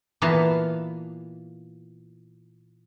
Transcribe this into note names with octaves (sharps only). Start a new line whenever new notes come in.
A#2 E3 A#3 B3 F5 A5